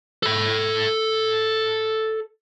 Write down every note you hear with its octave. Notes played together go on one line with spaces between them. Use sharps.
A4 B5